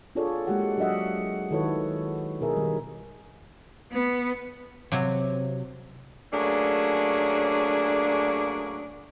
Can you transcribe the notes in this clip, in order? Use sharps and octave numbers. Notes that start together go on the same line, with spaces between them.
D4 F4 G#4 A4 C#5 D5
G#3 A#3 F#4 G4 F#5
F#3 D4 F#4 D#5 E5 F#5
D#3 E4 F#4 A4 B4 C#5
B2 D#4 G#4 A#4 E5
D#3 G3
B3
C3 F#3
F#3 A3 A#3 C#4 D4 G#4